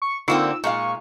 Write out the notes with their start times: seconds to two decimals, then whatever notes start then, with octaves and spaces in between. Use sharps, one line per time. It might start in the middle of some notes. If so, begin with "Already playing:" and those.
0.02 C#6
0.28 D3 A#3 C4 D#4 F4 E6
0.64 A#2 G#3 F5 C#6